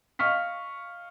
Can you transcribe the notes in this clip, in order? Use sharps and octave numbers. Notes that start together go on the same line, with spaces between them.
D#5 F5 C#6 F6 B6